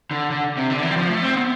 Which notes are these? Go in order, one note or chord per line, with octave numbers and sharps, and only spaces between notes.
D3
D3
C3
D3
E3
G3
F3
A3
C4
B3